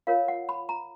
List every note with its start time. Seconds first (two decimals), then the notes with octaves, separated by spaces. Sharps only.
0.07 F4 A#4 C#5 F5
0.28 F#5
0.49 B5
0.69 A#5